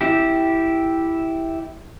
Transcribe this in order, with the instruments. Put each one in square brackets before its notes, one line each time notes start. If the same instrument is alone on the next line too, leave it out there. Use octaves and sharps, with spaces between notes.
[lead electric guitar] E4 G4